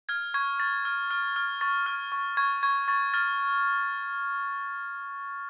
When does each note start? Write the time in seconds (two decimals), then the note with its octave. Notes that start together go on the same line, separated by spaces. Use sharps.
0.09 F6 G#6
0.34 C#6 G#6
0.60 C#6 A6
0.85 F6
1.11 F6
1.36 F6
1.61 C#6 A6
1.86 F6
2.12 C#6
2.37 C#6 G#6
2.63 C#6 G#6
2.88 C#6 A6
3.14 F6 A6